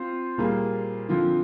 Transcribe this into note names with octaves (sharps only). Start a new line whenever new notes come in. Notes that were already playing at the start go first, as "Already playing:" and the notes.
Already playing: C4 F4 C5
A#2 G3 A#3 F4 G#4
D3 F3 C4 F4